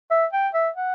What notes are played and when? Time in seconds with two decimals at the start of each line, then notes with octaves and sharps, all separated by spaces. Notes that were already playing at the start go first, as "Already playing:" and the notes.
0.11 E5
0.33 G5
0.54 E5
0.76 F#5